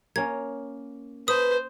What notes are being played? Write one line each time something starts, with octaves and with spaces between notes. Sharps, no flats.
A#3 C#4 G#6
B4 C5 A5 D#6